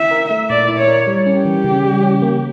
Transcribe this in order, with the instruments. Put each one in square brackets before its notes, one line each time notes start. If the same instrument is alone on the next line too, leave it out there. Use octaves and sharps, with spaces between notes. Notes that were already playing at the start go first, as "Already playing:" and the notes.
Already playing: [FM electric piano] E4 [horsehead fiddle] E5
[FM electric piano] A#4
A3
[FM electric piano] A#2 [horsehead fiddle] D5
[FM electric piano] E4
[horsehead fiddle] C#5
[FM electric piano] A#4
G3
C#4
[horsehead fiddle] G4
[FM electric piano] E3
C#3
G3
C#4
A#3